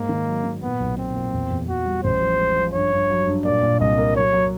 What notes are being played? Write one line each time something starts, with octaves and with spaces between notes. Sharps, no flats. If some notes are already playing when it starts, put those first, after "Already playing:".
Already playing: G#2 A#3
D#3
F#3
D#3
A#2 B3
B1
A#2 C4
A#2
E2
E2
E2 F#4
G3
A1 C5
F3
G#3
F3
G2 C#5
G2
F#3
G2
A#2 D5
A#2
C2 D#5
A#3
F#3 C#5
F#3